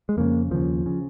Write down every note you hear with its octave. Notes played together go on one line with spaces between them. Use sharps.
G#3
F2 C#3 A#3
D#2 C#3 F3
C#3